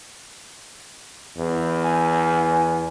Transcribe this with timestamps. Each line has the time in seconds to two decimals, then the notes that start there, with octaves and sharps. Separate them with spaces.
1.38 E2
1.84 G#5